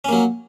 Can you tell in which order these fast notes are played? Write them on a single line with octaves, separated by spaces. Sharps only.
C#4 A#3 F#3